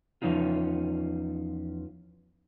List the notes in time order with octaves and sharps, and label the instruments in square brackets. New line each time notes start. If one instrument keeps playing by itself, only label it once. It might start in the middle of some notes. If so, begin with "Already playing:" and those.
[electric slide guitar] E2 C3 F3 C#4 D#4 F4